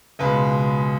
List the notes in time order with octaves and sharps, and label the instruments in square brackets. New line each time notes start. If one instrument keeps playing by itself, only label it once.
[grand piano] C#2 B2 G#3 B4